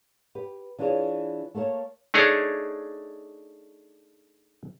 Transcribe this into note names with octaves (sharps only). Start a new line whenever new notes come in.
G4 B4
E3 D4 F4 G4 G#4 C#5
A3 A#3 A4 C#5
A3 D4 D#4 G#4 C#5